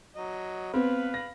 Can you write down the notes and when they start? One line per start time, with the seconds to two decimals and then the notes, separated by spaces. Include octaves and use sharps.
0.16 F#3 D#5
0.74 B3 C4 B4 F5 B5
1.14 A#6